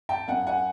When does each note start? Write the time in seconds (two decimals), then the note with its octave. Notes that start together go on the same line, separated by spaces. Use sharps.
0.09 G5 A5
0.28 F#2 F#5 G#5
0.47 F#5 G#5